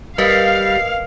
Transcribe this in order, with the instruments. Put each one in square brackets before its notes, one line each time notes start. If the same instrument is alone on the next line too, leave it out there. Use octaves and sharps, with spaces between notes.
[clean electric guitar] G3 [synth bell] A#4 B4 D#5 [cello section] F5